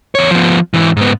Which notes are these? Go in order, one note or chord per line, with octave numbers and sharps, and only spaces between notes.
E2 C#5
F3 B3
G#2 E3
G#2 B3